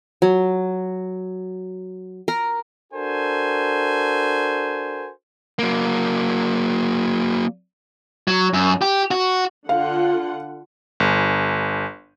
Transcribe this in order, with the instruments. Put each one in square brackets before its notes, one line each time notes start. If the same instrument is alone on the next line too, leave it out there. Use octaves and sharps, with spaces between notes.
[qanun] F#3
A#4
[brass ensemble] D4 F#4 A4 A#4 C5 G#5
[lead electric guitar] F#3 A#3
F#3
F#2
G4
F#4
[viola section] D3 F4 F#5 [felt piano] F5
[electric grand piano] G1